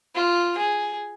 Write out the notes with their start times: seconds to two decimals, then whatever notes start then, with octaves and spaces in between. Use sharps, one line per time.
0.15 F4
0.57 G#4